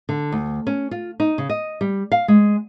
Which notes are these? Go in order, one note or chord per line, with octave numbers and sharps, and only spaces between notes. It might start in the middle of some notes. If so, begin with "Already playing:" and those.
D3
D2
C#4
F4
D#4
C#3
D#5
G3
F5
G#3